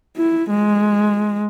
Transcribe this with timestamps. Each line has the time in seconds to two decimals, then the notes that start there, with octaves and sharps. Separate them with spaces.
0.16 E4
0.50 G#3